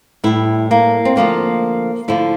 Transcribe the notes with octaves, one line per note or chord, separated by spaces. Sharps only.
A2 G3 E4
A#3
C4
D3 F3 A3 A#3
D3 F3 A3 E4